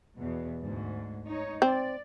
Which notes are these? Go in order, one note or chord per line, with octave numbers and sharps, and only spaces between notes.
E2 B2
D2 G#2
D#4 C#5
C4 D5